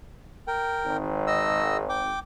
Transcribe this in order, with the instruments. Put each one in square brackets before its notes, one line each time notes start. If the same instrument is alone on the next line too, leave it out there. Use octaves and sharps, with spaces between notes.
[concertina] A#4 G5
[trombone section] G#1
[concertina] D#5 E6
G5 D6